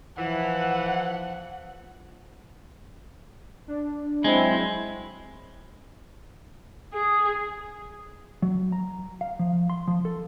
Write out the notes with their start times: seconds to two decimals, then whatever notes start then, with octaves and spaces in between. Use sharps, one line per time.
0.18 E3 F3 F#5
3.67 D4
4.24 F#3 G#3 C4 E4
6.93 G#4
8.42 F#3
8.72 A#5
9.21 F5
9.39 F3
9.70 C6
9.88 F3
10.05 A4